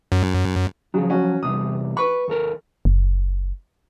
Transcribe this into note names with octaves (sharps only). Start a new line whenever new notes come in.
F#2
C#3 F3 F#3
C#4 F#4
E2 C3 G3 D#6
B4 B5 C#6
D#2 A4 A#4
F#1